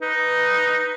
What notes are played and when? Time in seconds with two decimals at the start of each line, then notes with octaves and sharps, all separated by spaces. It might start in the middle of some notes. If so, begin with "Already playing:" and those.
0.02 D#4 B4